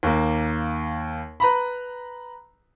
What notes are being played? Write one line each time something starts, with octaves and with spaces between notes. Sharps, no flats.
D#2 A#3
B4 A#5 B5